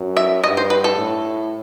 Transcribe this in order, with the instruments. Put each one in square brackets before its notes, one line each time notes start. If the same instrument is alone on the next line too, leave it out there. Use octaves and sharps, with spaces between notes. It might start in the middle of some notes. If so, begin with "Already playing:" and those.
Already playing: [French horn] F#2
[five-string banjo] E5
[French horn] G2 [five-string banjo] D#5
[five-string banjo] C5
B4
A4
[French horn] A2